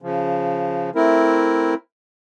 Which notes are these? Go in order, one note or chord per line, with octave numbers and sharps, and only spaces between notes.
C#3 F3
A3 C4 E4 A#4